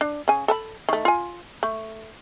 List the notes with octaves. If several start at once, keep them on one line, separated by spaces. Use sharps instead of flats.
D4
C#3 G#5
A4 A5 B5
D#3 A3
F4 G#5
A3